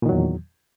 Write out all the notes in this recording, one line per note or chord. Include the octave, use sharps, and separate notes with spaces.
E2 A#2 D#3 F#3